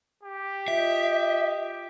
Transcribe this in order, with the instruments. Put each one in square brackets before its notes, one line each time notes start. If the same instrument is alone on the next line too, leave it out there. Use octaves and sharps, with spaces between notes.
[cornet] G4
[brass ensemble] F4 D#5 [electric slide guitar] E5